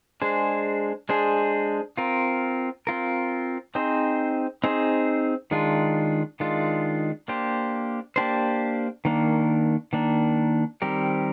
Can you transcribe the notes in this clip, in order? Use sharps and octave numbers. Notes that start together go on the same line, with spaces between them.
G#3 D4 G#4 C5
G#3 D4 G#4 C5
C4 F4 A#4
C4 F4 A#4
C4 D#4 G#4 C5
C4 D#4 G#4 C5
D#3 G#3 D4 F4
D#3 G#3 D4 F4
A#3 D4 G4 C5
A#3 D4 G4 C5
D#3 A#3 D4
D#3 A#3 D4
D#3 G3 C4 G4 A#4